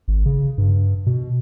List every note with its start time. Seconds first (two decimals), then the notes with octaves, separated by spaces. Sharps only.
0.08 G#1
0.26 C#3
0.58 G2
1.06 B2